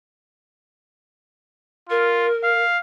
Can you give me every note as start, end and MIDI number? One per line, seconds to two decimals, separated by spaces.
1.90 2.28 65
1.90 2.62 70
2.44 2.79 77